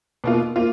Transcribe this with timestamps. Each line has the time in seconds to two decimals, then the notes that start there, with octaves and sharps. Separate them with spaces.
0.24 B2 A#3 F4
0.56 A#3 F4